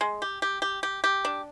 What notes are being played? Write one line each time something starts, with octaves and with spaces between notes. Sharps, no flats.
G#3
G4
G4
G4
G4
G4
D4